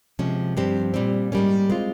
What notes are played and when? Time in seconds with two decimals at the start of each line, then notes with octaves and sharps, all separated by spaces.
0.19 C3 F3 G#3 C#4
0.57 G2 F3 C4 G4 C5
0.94 A#2 G3 C4
1.32 G#2 G3 A#3 C#4
1.70 G#3 C4 F4